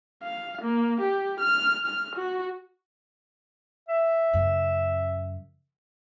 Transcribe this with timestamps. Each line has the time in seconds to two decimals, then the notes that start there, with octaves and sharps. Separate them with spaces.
0.23 F5
0.61 A#3
1.01 G4
1.40 F6
1.86 F6
2.15 F#4
3.89 E5
4.33 F#2 C#3